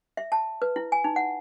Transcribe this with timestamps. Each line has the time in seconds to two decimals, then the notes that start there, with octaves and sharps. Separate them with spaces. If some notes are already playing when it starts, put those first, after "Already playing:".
0.17 E5
0.32 A5
0.62 B4
0.76 E4
0.92 G#5
1.04 D#4
1.16 F#5